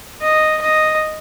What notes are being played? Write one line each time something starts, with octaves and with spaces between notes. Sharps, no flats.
D#5
D#5